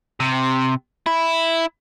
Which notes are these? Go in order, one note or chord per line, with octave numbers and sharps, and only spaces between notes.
C3
E4